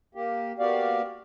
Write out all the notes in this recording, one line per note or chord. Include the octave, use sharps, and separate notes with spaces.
A#3 G4
A#3 B3 F#4 G4 D5 F5